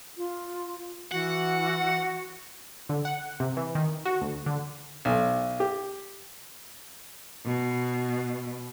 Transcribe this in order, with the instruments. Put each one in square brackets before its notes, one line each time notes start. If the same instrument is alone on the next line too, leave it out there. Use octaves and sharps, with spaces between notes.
[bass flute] F4
[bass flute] E3 [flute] F#4 [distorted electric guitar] F#5
[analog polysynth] D3
F#5
C3
E3
D#3
F#4
D2
D3
[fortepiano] B1
G4
[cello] B2